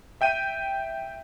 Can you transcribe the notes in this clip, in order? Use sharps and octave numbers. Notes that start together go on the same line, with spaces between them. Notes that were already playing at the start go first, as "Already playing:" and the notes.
E5 G5 G6 D#7